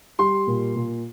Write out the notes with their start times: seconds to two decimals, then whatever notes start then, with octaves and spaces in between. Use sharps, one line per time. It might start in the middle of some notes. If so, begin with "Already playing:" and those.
0.19 G3 C6
0.47 A#2
0.76 A#2